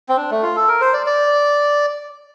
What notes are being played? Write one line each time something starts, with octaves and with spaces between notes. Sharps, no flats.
C4
D4
A3
F4
A4
A#4
C5
D5
D5